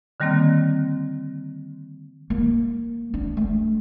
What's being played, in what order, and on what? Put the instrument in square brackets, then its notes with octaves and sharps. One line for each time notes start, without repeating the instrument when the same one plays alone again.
[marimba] D3 D#3 G3 A#3 C4
[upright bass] A#3
D4
A3